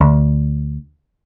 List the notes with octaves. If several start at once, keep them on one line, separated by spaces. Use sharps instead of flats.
D2